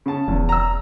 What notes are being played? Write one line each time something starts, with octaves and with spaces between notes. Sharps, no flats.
C#3 A5
E1 E2
A#5 E6